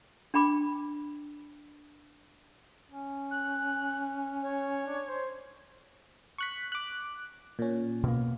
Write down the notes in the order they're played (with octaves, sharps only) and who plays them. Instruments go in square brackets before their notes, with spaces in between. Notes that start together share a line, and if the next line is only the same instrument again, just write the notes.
[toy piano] D4 G5 B5 D6
[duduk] C#4
[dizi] F#6
C#5
[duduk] D4
C5
[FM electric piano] C#6 F#6 B6
D6 F#6
A#2 C#4
[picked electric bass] B2 A#3